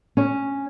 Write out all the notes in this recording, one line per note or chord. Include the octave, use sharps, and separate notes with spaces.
C#4